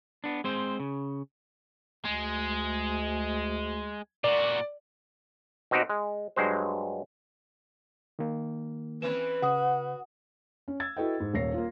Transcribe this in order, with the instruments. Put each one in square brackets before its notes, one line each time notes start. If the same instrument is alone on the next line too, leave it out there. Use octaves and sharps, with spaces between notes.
[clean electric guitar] B3 D4
G#3 C4 C5
C#3
[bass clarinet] D2 [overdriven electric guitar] G#3
[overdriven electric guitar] A#2 F#4 [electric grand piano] D5
[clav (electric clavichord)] B2 C4 D#4 F#4 G4
G#3
G2 F#3 G#3 C5
[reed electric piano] D#3 A#3
[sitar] E3 C4 C#4 [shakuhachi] B4 [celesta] E7
[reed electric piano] C#3 [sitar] F#4 [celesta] F#5 D#6
[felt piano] C#4
E6 G#6 A6
E4 F#4 A4 B4 D#5 G5
G#2
D#1 A#3 C#5 A#6 C7
A#3 F4